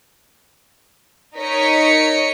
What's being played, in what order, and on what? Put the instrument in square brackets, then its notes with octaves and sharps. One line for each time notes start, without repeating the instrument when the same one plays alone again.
[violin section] D#4 A#4 C#5 D#5 B6 C#7